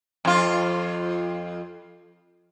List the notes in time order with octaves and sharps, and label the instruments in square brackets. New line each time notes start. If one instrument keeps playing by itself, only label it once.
[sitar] F2 F4